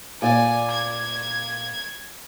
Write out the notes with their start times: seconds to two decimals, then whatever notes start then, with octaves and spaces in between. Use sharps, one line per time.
0.22 A#2 D5 G#5
0.71 G#6